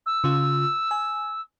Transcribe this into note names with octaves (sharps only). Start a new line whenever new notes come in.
E6
C#3 F4
G#5